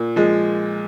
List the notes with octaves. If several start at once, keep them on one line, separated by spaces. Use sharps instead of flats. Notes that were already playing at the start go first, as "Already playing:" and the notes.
Already playing: A#2
F3 G#3